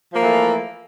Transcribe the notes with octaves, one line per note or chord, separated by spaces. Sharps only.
E3 F3 A3 A#3